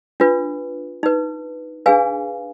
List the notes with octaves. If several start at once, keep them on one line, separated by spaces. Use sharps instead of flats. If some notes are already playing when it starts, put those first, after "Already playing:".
D4 F4 B4
D#4 B4
D4 G#4 B4 F5 G#5